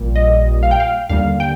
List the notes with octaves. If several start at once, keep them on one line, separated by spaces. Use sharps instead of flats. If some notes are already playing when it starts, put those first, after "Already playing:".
Already playing: A#1 A#2 G3
D#5
F5
G5
F5
D#2 D3 G3 A#3 F5
G5